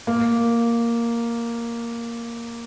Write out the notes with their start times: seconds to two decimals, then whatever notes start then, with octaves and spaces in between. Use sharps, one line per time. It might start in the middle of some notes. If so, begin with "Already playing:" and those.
0.07 A#3